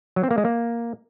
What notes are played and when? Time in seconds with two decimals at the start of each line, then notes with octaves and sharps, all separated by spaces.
0.16 F#3
0.23 C4
0.31 A#3
0.38 G#3
0.45 A#3